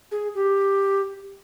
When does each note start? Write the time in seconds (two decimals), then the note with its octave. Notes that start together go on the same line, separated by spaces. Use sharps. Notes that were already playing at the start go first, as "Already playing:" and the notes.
0.11 G#4
0.35 G4